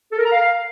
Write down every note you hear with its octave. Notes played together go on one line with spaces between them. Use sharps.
A4
A#4
A#5
F5